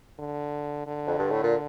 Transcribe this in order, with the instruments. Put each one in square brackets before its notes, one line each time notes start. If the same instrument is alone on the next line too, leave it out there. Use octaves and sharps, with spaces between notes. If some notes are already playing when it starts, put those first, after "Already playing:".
[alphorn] D3
D3
[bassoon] F2
G2
A2
A#2